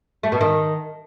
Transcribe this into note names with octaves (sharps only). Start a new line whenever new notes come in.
A3
B2
D#3